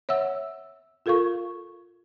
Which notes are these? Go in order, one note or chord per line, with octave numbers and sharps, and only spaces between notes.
C#5 E5 F#5 E6
F4 A4 A#4 F5 C#6